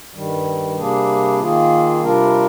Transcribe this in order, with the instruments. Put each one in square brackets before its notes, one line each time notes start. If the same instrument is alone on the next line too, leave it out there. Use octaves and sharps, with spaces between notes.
[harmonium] G2 D#3 G3
C3 G3 A#3 D4 G#4
D#3 A#3 F4 G#4
C3 G3 D4 F4 A#4